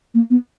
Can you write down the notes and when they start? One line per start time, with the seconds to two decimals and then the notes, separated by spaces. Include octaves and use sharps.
0.15 A#3
0.30 B3